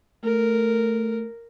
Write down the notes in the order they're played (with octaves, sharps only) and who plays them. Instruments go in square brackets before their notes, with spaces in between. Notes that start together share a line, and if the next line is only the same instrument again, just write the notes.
[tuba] A3 [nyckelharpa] A#4